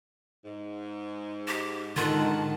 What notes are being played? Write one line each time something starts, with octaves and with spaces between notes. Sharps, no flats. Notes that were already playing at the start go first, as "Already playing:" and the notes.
G#2
G4
G#2 D3 D#3 F4 A#4 F#5 A5